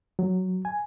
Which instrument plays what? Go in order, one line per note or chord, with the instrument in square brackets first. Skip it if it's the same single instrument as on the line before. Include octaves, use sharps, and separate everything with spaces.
[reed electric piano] F#3
G#5